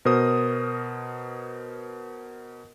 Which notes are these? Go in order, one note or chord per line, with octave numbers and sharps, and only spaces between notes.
B2 A#4 C5 D#6